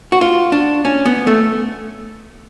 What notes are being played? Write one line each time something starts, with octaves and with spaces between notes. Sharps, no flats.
F#4
F4
D4
C#4
B3
A3